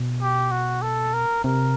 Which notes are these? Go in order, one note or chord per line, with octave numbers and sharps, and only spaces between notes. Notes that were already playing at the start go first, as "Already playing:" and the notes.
Already playing: B2
G4
F#4
A4
A#4
C3 A#4